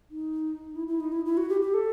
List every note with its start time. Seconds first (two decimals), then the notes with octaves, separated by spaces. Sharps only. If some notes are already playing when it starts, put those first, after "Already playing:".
0.11 D#4
0.76 E4
0.87 E4
1.00 D#4
1.12 E4
1.25 E4
1.37 F#4
1.49 G4
1.61 G4
1.74 A4